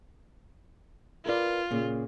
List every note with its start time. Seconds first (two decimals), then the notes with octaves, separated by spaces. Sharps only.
1.26 F4 A#4 B4 D5
1.70 A#2 C#3 A#3